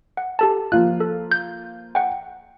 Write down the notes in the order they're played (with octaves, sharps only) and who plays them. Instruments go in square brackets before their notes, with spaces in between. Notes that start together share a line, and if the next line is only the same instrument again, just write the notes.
[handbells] F#5
G4 A4 A5
[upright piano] F3 A#3 F4 [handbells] F#6
[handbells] A4
G6
F#5 G5